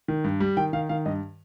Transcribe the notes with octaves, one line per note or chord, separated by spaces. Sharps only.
D#3
G2
G3
D#3 G5
D#3 F5
D#3 F5
G2 D#5